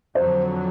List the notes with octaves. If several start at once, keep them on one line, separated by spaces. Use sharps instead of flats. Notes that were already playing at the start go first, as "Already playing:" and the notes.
F2 D3 F#3 C5